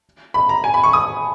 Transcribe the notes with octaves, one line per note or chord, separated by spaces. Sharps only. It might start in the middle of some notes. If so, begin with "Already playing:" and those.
B5
A#5
G#5
B5
C#6
D#6